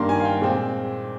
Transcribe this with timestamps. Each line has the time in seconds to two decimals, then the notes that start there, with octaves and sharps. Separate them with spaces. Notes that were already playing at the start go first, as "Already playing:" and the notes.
Already playing: G2 D#3 A#3 C6
0.09 G#5
0.20 F5
0.25 G5
0.42 A#2 G#3 C4